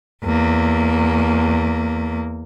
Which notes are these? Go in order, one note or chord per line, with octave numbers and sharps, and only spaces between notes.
E2 A#3